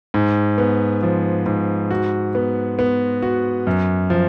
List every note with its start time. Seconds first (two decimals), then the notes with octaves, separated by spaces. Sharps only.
0.14 G#2
0.58 B3
1.03 F3
1.46 G#2
1.91 F#4
2.35 B3
2.79 B3
3.22 F#4
3.67 F#2
4.10 F3